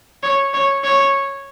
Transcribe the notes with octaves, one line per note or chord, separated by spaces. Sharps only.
C#5
C#5
C#5